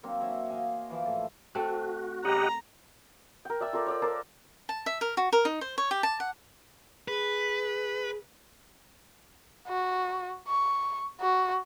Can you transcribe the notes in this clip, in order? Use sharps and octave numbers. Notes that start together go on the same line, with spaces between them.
F#3 A#3 C4 D4
F#4 C5 C#5 E5
D#5 F5 G#5
E3 F3 C5 D6
A2 A4
A3 C4 F#4
C#3 G3 G4 D#5 F#5 A#5
A#4 G5
D5 E5 A5 E6
F4 A4 A#4 D5
C#5 D5 E6
A#4 C5 A5 D6
A5
E5
A#4
F#4
A#4
D#4
C5
C#5
G4
A5
F#5
G#4 B4
F#4
C#6
F#4